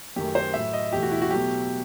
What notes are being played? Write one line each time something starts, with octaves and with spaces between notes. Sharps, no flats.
F#2 D#3 A3 G4
C5
A2 F#3 A3 E5
D#5
E2 B2 A3 G4
F#4
E4
F#4
B2 F#3 A3 G4